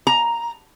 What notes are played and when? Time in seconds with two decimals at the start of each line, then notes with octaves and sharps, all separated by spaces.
0.07 A#5